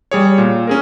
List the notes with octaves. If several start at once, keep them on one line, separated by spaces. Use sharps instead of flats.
G3 G#4 C#5
A#2
C#4 G#4 A#4